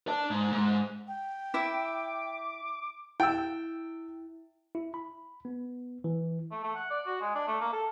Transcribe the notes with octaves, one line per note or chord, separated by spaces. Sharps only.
D5 A5
G#2
G#2
G5
E4 E5 D6
E4 G5 E6
E4
B5
B3
E3
A3
A3
F#5
D5
F#4
G#3
D4
A3
A#3
A4